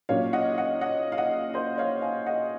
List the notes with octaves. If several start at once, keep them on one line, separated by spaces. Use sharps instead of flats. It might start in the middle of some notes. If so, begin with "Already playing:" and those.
A#2 F#3 C#4 C#5 F5
D#5 F#5
D#5 F#5
D#5 F#5
F5
D#5 F#5
C5 D#5
C#5 F5
F5 G#5
D#5 F#5